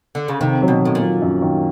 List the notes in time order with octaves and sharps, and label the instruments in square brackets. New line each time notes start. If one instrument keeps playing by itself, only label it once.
[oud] D3
C#3
[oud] C3 [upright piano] D#3
[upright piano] F#3
[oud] B2
[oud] A2 [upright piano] F#3
[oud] A#2
[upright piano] F#3
F#2
D#3